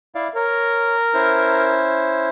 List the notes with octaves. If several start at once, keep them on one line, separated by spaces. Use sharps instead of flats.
E4 D5 F5
A#4 C#5
C#4 E4 C5